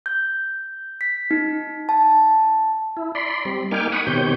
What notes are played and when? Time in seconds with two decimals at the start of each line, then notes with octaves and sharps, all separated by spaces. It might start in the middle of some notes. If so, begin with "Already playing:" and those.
0.06 G6
1.01 B6
1.31 D#4
1.89 A5
2.97 E4
3.15 D5 B5 C6
3.45 G3 C4
3.71 A#3 D#4 G5 G#5 D6 F6
3.92 F#5 B5 C#6 D#6
4.07 B2 D#3 C4 G4 C#5 G6